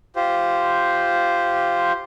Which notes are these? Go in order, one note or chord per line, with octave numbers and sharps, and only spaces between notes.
F4 G4 C5